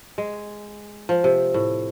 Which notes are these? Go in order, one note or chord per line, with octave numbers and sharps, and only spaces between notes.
G#3
F3
C3
A2